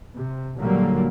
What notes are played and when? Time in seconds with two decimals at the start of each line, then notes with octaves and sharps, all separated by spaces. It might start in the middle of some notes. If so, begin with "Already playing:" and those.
0.15 C3
0.59 A#2 D3 F#3 G3 A#3